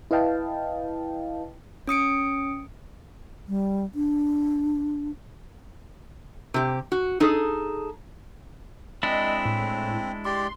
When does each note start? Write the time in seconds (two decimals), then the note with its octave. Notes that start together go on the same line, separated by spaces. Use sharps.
0.11 E4 B4 D#5 F5 G5 A5
1.87 C#4 D#6 C#7 D7
3.48 G3
3.95 D4
6.54 C3 G4
6.92 F#4
7.20 D#4 G#4 A4
9.03 G#3 C4 D4 E4 D#5
9.45 A2
10.25 G4 D5 C6